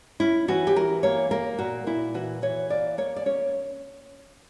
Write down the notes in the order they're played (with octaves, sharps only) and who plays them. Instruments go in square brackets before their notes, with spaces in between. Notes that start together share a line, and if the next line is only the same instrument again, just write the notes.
[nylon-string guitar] C#4 E4
E3 F#4
G4
E3 A#4
A#3 C#5
A#3 A#4
A#2 F#4
A#2 E4
E3 F#4
E3 C#5
A#3 D5
A#3 C#5
D5
C#4 C#5